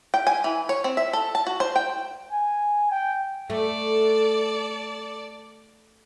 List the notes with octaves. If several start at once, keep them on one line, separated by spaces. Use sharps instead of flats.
G5
G#5
E3
C#5
C4
E5
A4
A5
F#4
C5
G5
G#5
G5
A3 A4 D5